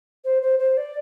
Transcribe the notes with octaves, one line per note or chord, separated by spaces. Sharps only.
C5
C5
C5
D5